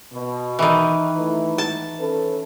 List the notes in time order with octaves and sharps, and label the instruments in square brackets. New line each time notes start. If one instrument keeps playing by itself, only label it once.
[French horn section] B2
[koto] D#3 E3
[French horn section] A3 E4 B4
[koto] A5
[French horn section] C#4 A4 B4